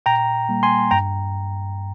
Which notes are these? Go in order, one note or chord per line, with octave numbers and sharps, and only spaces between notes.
A#2 G5 A#5
G3 A#3
G#5 C6
G2 G5 A#5